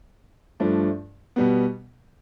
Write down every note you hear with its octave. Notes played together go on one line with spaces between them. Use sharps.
G2 F3 A3 D4
B2 G3 B3